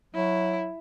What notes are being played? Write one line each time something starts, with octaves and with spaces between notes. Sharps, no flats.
F#3 E4